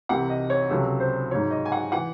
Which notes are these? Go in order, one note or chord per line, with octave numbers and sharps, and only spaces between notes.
C2 C3 E3 F#5
D#5
C#5
C#2 C3 F#3 A4
C5
G#2 F#3 C#5
D#5
G#5
F#5
E3 F#5